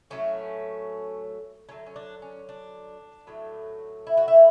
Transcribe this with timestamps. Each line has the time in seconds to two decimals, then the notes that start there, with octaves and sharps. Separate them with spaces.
0.10 A2 F#3 A3 C#4
1.69 D3 F#3 A3 C#4
1.86 C#4
1.96 D4
2.22 C#4
2.49 D4
3.27 A2 F#3 A3
4.07 E4
4.17 F#4
4.28 E4